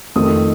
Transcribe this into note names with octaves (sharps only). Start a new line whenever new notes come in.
F2 D#3 A3 D#6